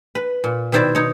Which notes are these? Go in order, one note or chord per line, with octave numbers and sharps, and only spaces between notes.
B4
A#2
B2 D#3 E4 C5 D5 E5
D#4 C#5